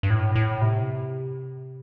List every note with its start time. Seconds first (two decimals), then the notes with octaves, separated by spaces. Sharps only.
0.03 G2
0.10 A2
0.36 A2
0.62 C3